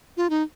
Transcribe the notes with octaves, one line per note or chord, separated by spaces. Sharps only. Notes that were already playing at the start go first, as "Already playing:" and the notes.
F4
D#4